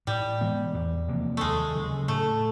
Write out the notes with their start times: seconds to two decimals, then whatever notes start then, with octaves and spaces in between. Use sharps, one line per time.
0.07 A2 G3
0.41 E3 G#3 B3
0.74 E2
1.08 C3 F3 A#3
1.37 D#2 G#3 A3
1.75 C#3 F#3
2.08 A2 A3